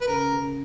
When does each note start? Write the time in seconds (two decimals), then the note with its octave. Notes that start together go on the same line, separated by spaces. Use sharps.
0.01 B4
0.07 C#3 A#4
0.32 C#3